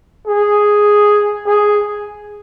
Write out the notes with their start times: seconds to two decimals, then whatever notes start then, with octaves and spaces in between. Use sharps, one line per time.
0.27 G#4
1.46 G#4